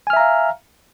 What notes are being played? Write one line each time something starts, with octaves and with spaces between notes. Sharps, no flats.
E5 F5 G#5 A#5 F6